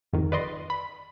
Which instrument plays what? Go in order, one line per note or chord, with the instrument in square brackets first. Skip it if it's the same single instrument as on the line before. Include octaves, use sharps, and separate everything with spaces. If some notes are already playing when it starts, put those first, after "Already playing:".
[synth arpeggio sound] G1 F2 D#3
B4 D5 D#5 C6
B5